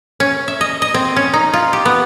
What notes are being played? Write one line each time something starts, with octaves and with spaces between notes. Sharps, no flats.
C#4
E5
D#5
D#5
C4
C#4
D#4
F4
G4
B3